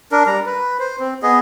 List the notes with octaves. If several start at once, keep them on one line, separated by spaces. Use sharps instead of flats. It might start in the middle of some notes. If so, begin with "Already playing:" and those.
D4 A#4
G3 A#5
B4
C5
C4
B3 G#4 D#5